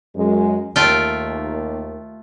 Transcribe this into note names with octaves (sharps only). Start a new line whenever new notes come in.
F#2 G#3
D#2 A3 F4 G5